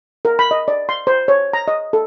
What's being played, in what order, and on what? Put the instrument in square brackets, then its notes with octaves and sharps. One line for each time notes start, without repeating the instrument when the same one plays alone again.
[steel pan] A#4
B5
D#5
D5
C6
C5
C#5
A#5
D#5
A4